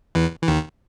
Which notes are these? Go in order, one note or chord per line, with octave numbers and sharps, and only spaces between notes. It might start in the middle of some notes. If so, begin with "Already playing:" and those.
E2 E3
E3
D#2 D#3